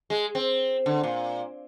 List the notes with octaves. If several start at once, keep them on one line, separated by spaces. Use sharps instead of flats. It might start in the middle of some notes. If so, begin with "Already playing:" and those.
G#3
C4
D3
A#2